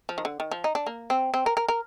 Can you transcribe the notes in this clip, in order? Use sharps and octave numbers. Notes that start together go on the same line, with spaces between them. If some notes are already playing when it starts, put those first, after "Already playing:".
F3
D#3
D3
D#3
F3
D#4
D4
A#3
C4
C4
A#4
A#4
A#4